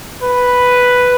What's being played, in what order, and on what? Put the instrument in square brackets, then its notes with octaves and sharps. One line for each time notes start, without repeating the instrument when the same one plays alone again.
[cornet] B4